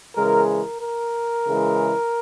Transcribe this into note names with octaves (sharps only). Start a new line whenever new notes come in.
C#3 E3 G#3 A#4
A#4
A#4
C#3 E3 G#3